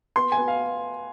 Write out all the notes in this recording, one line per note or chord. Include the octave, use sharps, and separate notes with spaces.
B3 C6
G#5
B3
F5